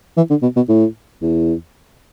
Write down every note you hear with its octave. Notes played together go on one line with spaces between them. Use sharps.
E3
D3
B2
B2
A2
E2